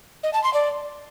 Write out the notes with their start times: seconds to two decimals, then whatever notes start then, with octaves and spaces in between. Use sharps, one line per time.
0.23 D#5
0.33 A5
0.44 C6
0.54 D5